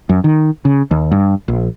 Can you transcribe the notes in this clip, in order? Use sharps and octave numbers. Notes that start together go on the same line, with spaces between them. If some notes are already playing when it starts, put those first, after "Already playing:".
F#2
D#3
C#3
D#2
G2
A#1